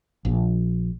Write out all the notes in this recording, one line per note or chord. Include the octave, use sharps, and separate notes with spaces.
A#1